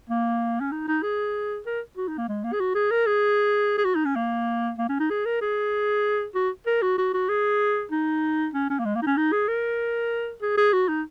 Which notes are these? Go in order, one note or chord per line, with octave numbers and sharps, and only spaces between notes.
A#3
C#4
D#4
D#4
G#4
A#4
F#4
D#4
A#3
G#3
A#3
G#4
F#4
G#4
A#4
G#4
G#4
F#4
D#4
C#4
A#3
A#3
C#4
D#4
G#4
A#4
G#4
F#4
A#4
F#4
F#4
F#4
G#4
D#4
C#4
C#4
A#3
G#3
A#3
D#4
C#4
D#4
G#4
A#4
G#4
G#4
F#4
D#4